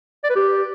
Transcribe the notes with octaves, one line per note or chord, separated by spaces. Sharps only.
D5
B4
G4